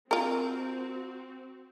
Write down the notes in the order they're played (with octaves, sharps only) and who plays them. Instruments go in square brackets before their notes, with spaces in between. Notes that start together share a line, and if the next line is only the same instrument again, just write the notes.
[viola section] C4 F#4 [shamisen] F4 A#4